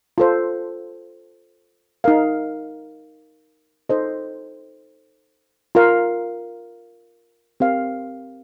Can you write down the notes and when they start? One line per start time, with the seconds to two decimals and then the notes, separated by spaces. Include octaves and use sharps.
0.18 F4 A4 C5
2.04 D#4 A#4 F5
3.89 D#4 A4 C5 D#5
5.75 F4 A#4 F5
7.60 C4 G4 A#4 F5